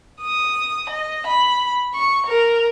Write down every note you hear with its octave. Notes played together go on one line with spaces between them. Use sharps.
D#6
D#5
B5
C#6
A#4